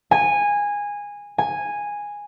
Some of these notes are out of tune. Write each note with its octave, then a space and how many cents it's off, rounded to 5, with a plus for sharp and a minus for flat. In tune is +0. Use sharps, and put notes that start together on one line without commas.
G#5 -15
G#5 -10